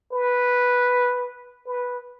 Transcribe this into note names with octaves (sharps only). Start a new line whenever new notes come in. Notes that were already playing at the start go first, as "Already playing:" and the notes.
B4
B4